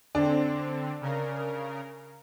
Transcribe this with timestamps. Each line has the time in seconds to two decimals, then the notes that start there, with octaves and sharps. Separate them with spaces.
0.15 D3 C4 D4
1.01 C#3 A#4